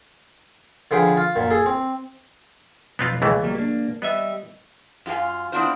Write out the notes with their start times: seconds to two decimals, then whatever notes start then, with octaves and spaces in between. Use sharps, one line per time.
0.91 D3 F3 G#4 B4 G5
1.17 F4
1.36 F#2 A#2
1.51 G#4 A4
1.66 C4
2.99 B1 F2 B3 C4 F4
3.22 C#2 E3 A3
3.43 F#3 G3 A#3
3.56 A#3 D4
4.02 G3 B3 D#5 E5
5.06 F#2 F4 G4 F5 G#5
5.52 B3 C4 D4 E4 F4 C5